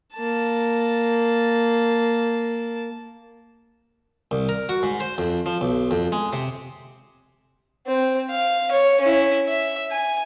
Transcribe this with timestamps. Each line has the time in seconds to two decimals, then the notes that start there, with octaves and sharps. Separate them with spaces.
0.15 A#3 A5
4.31 C2
4.49 A#4
4.69 F#4
4.83 G#2
5.00 C5
5.18 F2
5.46 F3
5.61 B1
5.91 F2
6.12 G#3
6.33 C3
7.87 C4
8.31 F5
8.71 C#5
9.01 C#4 E4
9.47 E5
9.92 G#5